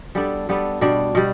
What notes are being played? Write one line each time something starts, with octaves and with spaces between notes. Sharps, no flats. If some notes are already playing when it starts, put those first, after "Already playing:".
G3 B3 D4 A4
G3 B3 D4 A4
B2 G3 D4
B2 G3